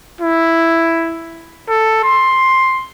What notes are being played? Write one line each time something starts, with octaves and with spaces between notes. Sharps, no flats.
E4
A4
C6